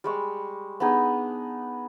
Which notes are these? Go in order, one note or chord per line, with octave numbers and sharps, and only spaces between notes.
G3 G#3 C#6
B3 D4 D#4 G#4